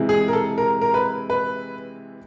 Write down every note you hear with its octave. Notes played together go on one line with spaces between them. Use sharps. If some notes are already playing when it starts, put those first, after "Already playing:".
Already playing: C3 E3 G#3
G#4
A#4
A4
A#4
A#4
B4
B4